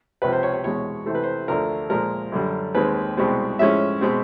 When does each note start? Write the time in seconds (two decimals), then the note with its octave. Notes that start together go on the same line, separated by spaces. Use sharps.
0.22 C#2 C3 F3 B4
0.32 C5
0.43 C#5
0.54 C#5
0.64 E2 B2 G#3 C#5
1.06 C3 E3 A3 C5
1.15 B4
1.23 C5
1.48 D2 D3 F3 A#4
1.90 A#2 F3 G#3 A#4
2.32 F#2 D3 G3
2.75 D#2 D#3 G#3 C4 B4
3.17 C2 B2 G#3 C4
3.59 A2 F3 G#3 C#4 E5
4.01 B2 G#3 C4